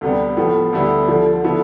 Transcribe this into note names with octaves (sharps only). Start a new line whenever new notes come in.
D2 C3 G3 B3
A2 F3 B3
D2 D3 G3 B3 E4
D2 D3 F3
D3 F3 B3 E4